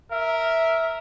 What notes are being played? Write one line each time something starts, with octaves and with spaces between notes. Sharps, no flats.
A#4 E5